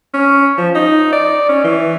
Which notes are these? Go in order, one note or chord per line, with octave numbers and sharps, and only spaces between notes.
C#4
F3
D#4
D5
C#4
E3